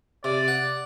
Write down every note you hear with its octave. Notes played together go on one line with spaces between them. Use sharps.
C3 D5
F#5